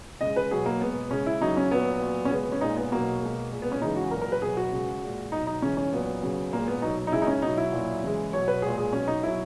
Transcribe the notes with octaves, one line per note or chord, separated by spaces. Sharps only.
C#3 G#3 D#5
B4
B2 F#3 G#4
A#3
B2 G#3 B3
C#3 G#3 C#4
E4
C#3 F#3 D#4
C#4
A#2 F#3 B3
A#2 F#3
C#4
C#3 G#3 B3
C#4
A#2 G#3 D#4
B3
B2 F#3 A#3
B2 G#3
A#2 G#3
B3
C#4
C#3 E3 G#3 D#4
F#4
A#2 F#3 A#4
A#4
B4
B2 F#3 G#4
F#4
C#3 G#3
A#2 G#3
B2 F#3 D#4
D#4
C#3 E3 G#3 C#4
C#4
A#2 F#3 B3
C#3 F#3
A#2 G#3 A#3
B3
B2 F#3 D#4
D#4
C#3 G#3 E4
D#4
C#4
B2 D#4
F#3
E4
A#2 F#3
C#3 E3 G#3
B2 F#3 C#5
B4
A#2 G#3 G#4
G#4
B2 F#3 C#4
D#4
B2 F#3 E4